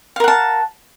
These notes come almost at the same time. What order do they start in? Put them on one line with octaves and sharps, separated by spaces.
F5 A#4 F#5 A5